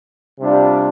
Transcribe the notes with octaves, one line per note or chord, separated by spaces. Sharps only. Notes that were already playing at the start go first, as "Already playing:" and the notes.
C3 G3 D4 F4